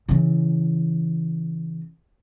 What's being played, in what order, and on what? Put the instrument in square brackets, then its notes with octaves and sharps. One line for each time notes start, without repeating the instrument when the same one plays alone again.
[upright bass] C#3 E3